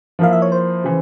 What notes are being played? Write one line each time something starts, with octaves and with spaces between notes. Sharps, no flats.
F3 A#3 E4 F5
E5
C#5
C5
C#3 E3